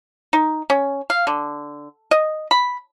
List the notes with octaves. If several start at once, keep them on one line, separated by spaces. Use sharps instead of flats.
D#4
C#4
F5
D3
D#5
B5